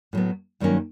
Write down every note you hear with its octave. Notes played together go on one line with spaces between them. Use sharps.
A2 F#3 B3
G2 D#3 F#3 A#3 C#4